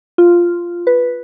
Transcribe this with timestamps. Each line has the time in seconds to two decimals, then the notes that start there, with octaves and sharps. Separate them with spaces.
0.18 F4
0.87 B4